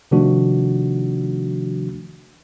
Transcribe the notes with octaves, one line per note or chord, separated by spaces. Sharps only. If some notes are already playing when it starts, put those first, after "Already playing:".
C3 D#3 F3 A3 D4 F#4